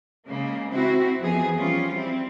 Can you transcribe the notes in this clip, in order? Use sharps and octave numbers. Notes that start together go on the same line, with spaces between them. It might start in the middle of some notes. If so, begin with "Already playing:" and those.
C#3 G#3 A#3
C4 E4 F#4
F2 E3 F3 B3 G#4
F3 G3 C#4 F4
C4 E4